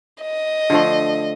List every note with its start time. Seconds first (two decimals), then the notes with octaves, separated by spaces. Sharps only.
0.23 D#5
0.70 D3 F3 A3